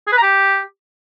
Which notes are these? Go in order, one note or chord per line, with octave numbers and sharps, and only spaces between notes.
G#4
B4
A#5
G4